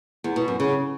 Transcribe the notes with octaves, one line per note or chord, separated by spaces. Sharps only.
E2
B2
F#2
C#3